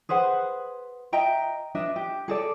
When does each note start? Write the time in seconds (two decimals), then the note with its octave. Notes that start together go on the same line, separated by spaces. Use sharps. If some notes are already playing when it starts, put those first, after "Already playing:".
0.09 G#4 B4 C5 F#5
1.12 D#5 E5 G5 A#5
1.75 D4 B4 D#5 E5
1.96 G4
2.28 G#4 A4 D5